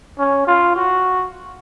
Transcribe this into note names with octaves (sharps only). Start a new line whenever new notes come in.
C#4
F4
F#4